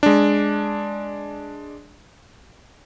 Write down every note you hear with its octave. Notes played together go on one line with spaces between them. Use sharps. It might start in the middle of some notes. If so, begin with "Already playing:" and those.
G#3 D4